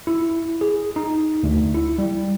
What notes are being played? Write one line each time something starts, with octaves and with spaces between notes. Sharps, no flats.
E4
G#4
D#4
D2
E4
G3